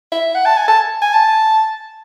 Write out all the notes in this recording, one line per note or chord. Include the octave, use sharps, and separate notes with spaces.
E5
F#5
A5
G#5
A5
G#5
A5